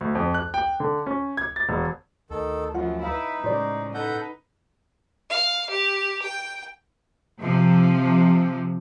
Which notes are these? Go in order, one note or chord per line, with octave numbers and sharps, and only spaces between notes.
D2
F2
F#6
G5
D3
C#4
G#6
A6
E1
D2 D#3 A4
F#2 F3 F#3 F4 B4 F#5
D#4 E4 B4 F5
A2 C#3 G#3 C5 D5
D#4 A4 B4 F#5 G6
F5
G4
G5
C3 F3